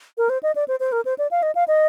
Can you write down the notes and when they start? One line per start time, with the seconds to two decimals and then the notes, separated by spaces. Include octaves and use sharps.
0.18 A#4
0.29 C5
0.43 D#5
0.55 D5
0.68 C5
0.80 C5
0.92 A#4
1.05 C5
1.18 D5
1.31 F5
1.42 D#5
1.55 F5
1.68 D#5